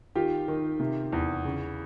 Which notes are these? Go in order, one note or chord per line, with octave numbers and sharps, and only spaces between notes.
D#3 F4 G4
D#3
C3
E2
C#3